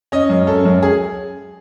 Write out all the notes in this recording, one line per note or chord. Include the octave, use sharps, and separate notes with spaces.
C#4 D#5
F#2
C#4 A4
F#2
G#4